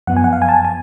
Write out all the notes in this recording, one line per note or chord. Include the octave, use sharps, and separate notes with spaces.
F#2 F3 B3 F#5
G#5
F#5
F5
G#5
A5
G#5
G#5